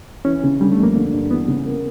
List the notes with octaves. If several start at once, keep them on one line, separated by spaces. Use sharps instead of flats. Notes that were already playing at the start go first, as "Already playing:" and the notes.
E3 C#4
C#3
D3 G3
A3
F2
A#3
D3
G2
E3 B3
C#3
A#3